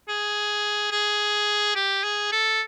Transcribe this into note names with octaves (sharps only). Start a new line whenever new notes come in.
G#4
G#4
G4
G#4
A4